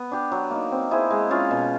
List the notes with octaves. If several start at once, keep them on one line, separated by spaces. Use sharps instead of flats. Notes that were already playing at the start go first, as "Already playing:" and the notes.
Already playing: B3
D4 G4
F#3
A#3 D#4
C4
E4 G#4 C5
G#3
C#4 F4 G#4
B2